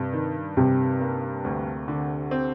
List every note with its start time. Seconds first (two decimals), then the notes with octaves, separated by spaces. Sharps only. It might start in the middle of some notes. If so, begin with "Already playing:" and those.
Already playing: G2 C3
0.13 D#3
0.57 G2 C3
1.00 A#3
1.44 D2
1.88 D3
2.31 C4